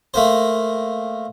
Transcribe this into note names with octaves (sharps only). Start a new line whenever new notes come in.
A3 A#3 C5